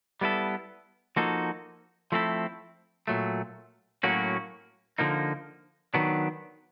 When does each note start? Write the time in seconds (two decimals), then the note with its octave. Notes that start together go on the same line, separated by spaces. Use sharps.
0.21 G3 B3 E4 A4
1.16 F3 A#3 D#4 F#4 A4
2.12 F3 A3 C4 E4 A4
3.08 A#2 F#3 A3
4.03 A2 F#3 A#3 C#4 F#4
4.98 D3 F3 A#3 D#4
5.94 D#3 F#3 B3 D4